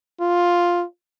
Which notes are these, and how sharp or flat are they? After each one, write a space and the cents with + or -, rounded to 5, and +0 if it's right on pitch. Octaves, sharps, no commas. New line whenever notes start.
F4 +5